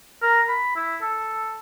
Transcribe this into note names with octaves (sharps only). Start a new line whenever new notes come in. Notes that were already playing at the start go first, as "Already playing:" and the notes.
A#4
B5
E4
A4